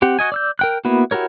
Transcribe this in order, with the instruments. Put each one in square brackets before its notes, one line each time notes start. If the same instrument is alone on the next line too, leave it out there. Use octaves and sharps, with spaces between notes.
[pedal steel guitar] C4 G4 F#5
F#4 D#5 G#5
D5 E6 G6
A#4 G5 F#6
A#3 B3 E4 F#4
E4 F#4 G4 A#4 C#5